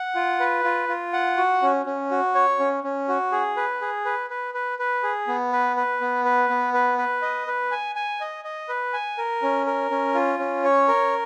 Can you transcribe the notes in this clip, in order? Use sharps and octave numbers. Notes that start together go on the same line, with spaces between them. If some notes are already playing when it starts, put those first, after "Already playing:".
Already playing: F#5
F4
B4
F4
F4
F#5
F#4
C#4
C#4
F#4
C#5
C#4
C#4
F#4
G#4
B4
G#4
B4
B4
B4
B4
G#4
B3
B4
B4
B3
B4
B3
B4
B4
D#5
B4
G#5
G#5
D#5
D#5
B4
G#5
A#4
C#4
A#4
C#4
F4
C#4
C#5
A#4